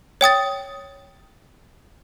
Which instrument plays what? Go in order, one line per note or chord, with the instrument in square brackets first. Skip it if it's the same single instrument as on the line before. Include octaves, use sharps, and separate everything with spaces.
[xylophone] C#5 G5 D#6 A6